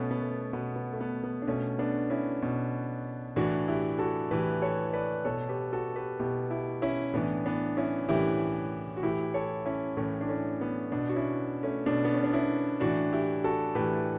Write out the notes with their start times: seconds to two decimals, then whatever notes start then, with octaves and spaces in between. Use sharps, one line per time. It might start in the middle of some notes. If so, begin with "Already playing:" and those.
Already playing: B2 A3 B3 C#4
0.11 B3
0.22 A3
0.53 B2 B3
0.76 B3
0.93 A3
1.00 B3
1.23 B3
1.42 D4
1.48 B2 A3 C#4
1.79 B3 D4
2.10 C#4 E4
2.42 B2
3.36 A2 E3 D4 F#4
3.68 E4 G4
3.99 F#4 A4
4.31 A2 E3 G4 B4
4.62 A4 C#5
4.93 B4 D5
5.25 B2 A4 C#5
5.49 G4 B4
5.73 F#4 A4
5.96 G4 B4
6.19 B2 E4 G4
6.51 E4 G4
6.82 C#4 E4
7.14 A2 E3 B3 D4
7.46 B3 D4
7.77 C#4 E4
8.09 A2 E3 E4 G4
8.97 F#4
9.03 A2 E3 E4 G4
9.34 A4 C#5
9.66 C#4 E4
9.97 A2 E3 A3 C#4
10.21 D4
10.29 A3 C#4
10.61 B3
10.92 B2 B3 D4
11.09 F#4
11.16 C#4 E4
11.63 A3 C#4
11.86 B2 B3 D4
12.05 B3
12.14 C#4
12.24 D4
12.33 C#4 E4
12.80 A2 E3 D4 F#4
13.12 E4 G4
13.44 F#4 A4
13.75 A2 E3 G4 B4